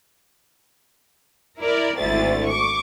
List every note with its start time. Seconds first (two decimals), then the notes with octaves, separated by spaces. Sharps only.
1.60 E4 A#4 D5
1.98 G#1 D2 E4 A6
2.47 C#6 D6